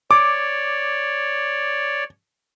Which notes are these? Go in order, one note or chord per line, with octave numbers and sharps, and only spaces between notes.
C#5 D5 D6